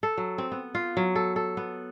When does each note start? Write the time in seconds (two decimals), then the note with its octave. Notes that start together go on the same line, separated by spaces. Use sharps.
0.03 A4
0.18 F#3
0.38 C4
0.52 B3
0.75 F4
0.97 F#3
1.16 A4
1.36 A4
1.57 B3